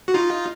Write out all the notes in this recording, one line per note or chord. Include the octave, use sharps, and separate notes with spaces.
F#4
D#4 F4